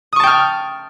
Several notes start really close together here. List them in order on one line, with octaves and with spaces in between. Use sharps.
D#6 C#6 A5 G5 F6